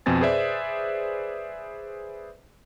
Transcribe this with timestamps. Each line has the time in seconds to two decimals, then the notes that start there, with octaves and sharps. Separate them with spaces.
0.06 F2 B2 C4 G#5 A6
0.21 G#4 B4 C5 D5 E5